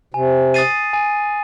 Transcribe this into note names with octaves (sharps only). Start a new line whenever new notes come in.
C3 G#5
D#6 A6 C7 D#7
G#5